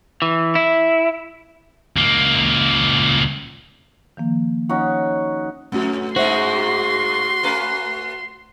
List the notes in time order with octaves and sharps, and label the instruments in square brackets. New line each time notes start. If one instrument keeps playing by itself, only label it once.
[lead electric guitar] E3
E4
[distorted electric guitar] C#2 A#3
[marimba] D#3 F3 A#3
[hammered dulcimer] C#4 D#4 F#4
[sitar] F2 [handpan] A3 C#4 F#4
[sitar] G2 G#3 D#4 [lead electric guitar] F#4 [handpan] C5 E5 [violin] C6
[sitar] A3 C#4 B4